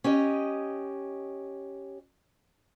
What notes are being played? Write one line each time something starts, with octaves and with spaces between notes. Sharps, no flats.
C#4 G4 D#5